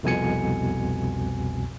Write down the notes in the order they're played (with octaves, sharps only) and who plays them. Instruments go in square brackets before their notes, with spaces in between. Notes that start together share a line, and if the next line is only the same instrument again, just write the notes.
[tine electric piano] C2 F2 B2 G#5 C#7